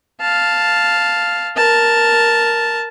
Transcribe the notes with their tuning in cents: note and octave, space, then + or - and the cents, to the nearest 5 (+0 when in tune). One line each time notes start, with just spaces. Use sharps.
F5 +0 A5 +0
A#4 +0 A5 +0